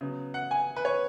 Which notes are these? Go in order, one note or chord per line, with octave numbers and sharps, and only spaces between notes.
C#3 F#3 B3
F#5
G#5
B4
C#5